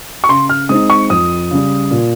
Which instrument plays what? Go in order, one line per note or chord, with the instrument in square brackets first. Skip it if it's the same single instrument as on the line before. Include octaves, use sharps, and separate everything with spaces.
[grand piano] C#6
C#3 C6
F6
G#3 C4 D#4 D#6
C#6
F2 D#6
C#3 G3
A#2